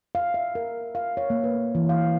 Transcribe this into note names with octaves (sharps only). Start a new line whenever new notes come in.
F5
E5
A#4
F5
C#5
A#3
B4
E3
F5